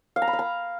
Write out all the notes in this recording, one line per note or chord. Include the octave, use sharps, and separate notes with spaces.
F5
A#5
B5
F5
A#5